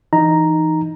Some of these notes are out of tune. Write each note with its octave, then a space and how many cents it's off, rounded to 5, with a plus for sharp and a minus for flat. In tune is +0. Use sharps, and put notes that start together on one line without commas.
E3 +20 D#4 +0 A#5 +0